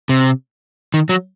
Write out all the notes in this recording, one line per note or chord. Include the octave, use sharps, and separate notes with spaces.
C3
D#3
F#3